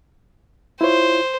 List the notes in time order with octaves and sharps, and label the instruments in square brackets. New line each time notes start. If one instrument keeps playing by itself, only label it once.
[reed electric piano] E4 F4 C#5 [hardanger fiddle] C5